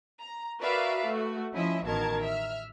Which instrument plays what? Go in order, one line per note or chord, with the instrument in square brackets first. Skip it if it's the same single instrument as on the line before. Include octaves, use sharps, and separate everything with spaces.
[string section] A#5
F#4 A#4 B4 D5 E5 F5
A3 F#4
F3 C#4 E4 D#5 E5
A1 B2 D#3 A#4 A5 G#6
E5 F6